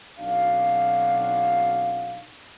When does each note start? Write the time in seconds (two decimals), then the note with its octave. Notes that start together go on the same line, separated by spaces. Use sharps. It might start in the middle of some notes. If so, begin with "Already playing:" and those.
0.20 B1 C4 D4 F#4 F5